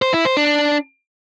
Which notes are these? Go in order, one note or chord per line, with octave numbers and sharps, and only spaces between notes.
C5
E4
C5
D4